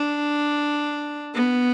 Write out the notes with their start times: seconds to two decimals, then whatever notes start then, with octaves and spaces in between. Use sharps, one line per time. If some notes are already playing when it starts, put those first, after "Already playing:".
Already playing: D4
1.34 B3